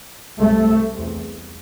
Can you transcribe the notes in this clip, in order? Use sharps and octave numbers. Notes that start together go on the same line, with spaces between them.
C2 C3 A3
E2 C3